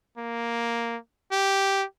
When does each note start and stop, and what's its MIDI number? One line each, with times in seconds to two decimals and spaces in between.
0.17 0.97 58
1.32 1.84 67